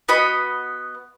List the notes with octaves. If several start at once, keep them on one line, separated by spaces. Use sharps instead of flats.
B3 F#4 D#5 B5